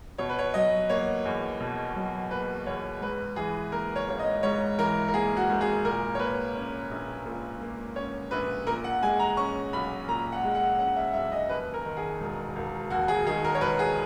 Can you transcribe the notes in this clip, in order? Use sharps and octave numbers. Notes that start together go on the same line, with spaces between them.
B2 C#5
B4
C#5
F#3 D#5
A#3 C#5
E2
B2
F#3
A#3 B4
E2 C#5
G#2 B4
E3 G#4
A#3 A#4
C#5
G#1 C#5
D#5
G#2 C#5
E3 A#4
A#4
A#3 G#4
F#4
G#1
G#4
A#2 A#4
C#5
A#3 B4
C#4
A#1
A#2
A#3
C#4 C#5
A#1 B4
A#2 A#4
F#5
G#3 G#5
A#5
C#4 C#6
B1 B5
A#2 A#5
F#5
G#3
F#5
C#4 F#5
E5
B1 E5
D#5
D#2 B4
A#4
D#3
G#4
E1
E1
D#2 F#4
G#4
D#3 G#4
A#4
C#5
E1 B4
G#4